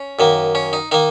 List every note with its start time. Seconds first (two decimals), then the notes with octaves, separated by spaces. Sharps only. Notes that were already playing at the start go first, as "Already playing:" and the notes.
Already playing: C#4
0.19 F#2 D#3 A#3
0.55 C#4
0.73 D#4
0.92 D#3 A#3 D#4